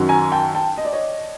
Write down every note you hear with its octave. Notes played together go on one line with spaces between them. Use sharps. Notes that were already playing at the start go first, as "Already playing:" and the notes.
Already playing: F#2 D#3 F#3
G#5 A#5
G5 A5
G5 A5
D#5
D5
C#5 D#5